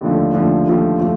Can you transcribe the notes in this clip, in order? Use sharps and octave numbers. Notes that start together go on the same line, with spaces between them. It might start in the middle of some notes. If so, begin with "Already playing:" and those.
D#2 D3 F3 A3
D#2 D3 F3 A3
D#2 D3 F3 A3
F3 A3